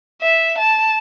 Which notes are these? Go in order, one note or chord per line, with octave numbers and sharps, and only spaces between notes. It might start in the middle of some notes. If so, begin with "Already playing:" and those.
E5
A5